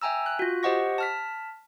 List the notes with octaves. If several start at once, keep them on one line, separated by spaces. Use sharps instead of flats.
E5 G5 G#5 A#5 E6
F#6
F4 F#4
G4 C5 D#5 F#5 C#6 A#6
A5 F6 B6